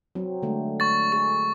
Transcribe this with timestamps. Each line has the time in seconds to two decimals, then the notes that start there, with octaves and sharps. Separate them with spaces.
0.15 F#3 C4
0.43 D3 G#3 A3
0.80 C#6 A6
1.12 G#4 C#6